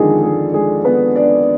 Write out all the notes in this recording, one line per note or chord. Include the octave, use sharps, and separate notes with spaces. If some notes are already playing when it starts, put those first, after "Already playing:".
Already playing: F2 D3 D#3 F3 G#3 D#4 G#4
G#3 G#4
G#3 G#4
B3 B4
D4 D5